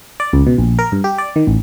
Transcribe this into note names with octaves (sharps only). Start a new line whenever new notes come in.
D5
C#2
B2
A#1
A#4
G2
G4
D5
D#3
A1